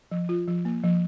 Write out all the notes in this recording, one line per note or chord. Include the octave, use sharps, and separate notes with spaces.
F3
F4
F3
A#3
F3